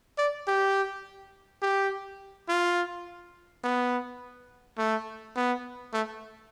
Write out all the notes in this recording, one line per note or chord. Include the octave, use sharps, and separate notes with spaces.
D5
G4
G4
F4
B3
A3
B3
A3